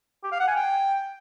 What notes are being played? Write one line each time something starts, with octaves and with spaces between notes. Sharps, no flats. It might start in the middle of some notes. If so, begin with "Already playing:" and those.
G4
F5
F#5
G#5
G5